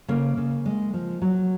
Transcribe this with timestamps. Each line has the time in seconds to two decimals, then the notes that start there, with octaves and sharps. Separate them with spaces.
0.08 C#3 A#3
0.37 C#3
0.66 G#3
0.94 F3
1.22 F#3